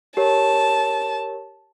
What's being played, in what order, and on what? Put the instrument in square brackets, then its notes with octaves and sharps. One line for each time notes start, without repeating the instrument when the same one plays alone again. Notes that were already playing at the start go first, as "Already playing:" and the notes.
[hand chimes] G4 A#4 C#5 [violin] A5